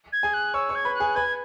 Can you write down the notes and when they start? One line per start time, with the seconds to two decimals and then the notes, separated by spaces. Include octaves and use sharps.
0.13 G#6
0.23 G#4 G#5
0.34 F#6
0.54 C#5 C#6 E6
0.69 C#5 C#6
0.75 G#6
0.85 B4 B5
0.95 F#6
1.00 G#4 G#5
1.16 B4 B5 G#6